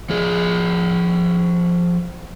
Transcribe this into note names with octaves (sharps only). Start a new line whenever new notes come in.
F3 G#4